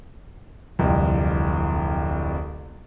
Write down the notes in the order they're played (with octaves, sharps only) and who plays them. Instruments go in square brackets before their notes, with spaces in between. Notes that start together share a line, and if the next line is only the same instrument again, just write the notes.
[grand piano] D1 C2 F2